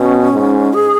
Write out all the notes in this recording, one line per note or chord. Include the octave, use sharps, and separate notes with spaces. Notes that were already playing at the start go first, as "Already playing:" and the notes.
Already playing: B2 C#4
G#2
G#4